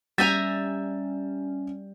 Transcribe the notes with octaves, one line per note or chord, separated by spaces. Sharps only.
G3 C#4 E5 G#5 A#5 G6 A6